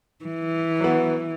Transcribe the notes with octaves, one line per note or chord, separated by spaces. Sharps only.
E3
F#3 B3